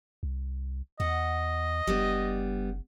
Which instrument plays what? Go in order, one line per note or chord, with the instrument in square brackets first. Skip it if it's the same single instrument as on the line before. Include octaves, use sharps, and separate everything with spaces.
[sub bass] C2
[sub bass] E2 [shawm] D#5 [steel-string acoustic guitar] F#5
[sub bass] F#1 [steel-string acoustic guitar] G3 B3 D4